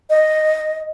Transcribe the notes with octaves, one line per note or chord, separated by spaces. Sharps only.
D#5